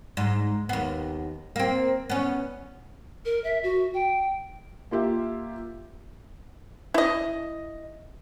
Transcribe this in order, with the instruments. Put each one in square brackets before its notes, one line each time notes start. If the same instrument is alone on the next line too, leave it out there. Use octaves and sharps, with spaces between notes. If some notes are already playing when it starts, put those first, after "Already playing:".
[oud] G#2
D#2 B3
A#3 C4
B3 C#4
[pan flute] A#4
E5
F#4
G5
[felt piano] A#3 F4 G4 E5
[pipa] E4 D#5